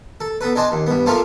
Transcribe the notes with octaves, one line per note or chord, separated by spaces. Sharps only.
A4
B3 A4 B4
D4 G#4 C5 D#5 A5
D#2
G2 B3
F3 A3 A#3 F4 A4 C5